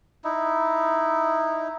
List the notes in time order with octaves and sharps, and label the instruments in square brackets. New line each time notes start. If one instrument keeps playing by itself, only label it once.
[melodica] D#4 E4